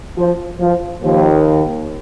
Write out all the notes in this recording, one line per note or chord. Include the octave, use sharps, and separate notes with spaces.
F3
F3
D#2 D#3 F3